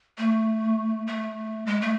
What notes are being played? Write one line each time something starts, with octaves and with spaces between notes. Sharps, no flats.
A3
A3
G#3
A3